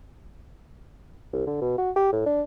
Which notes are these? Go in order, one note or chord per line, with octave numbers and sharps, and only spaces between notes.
C2
D3
B2
F#4
G4
A2
D4